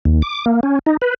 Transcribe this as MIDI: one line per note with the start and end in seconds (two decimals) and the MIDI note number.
0.05 0.22 39
0.22 0.45 86
0.46 0.60 58
0.63 0.79 61
0.86 0.97 63
1.02 1.14 71